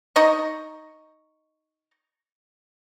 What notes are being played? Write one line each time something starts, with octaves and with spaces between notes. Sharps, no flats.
D#4 D#5 A#5 C#6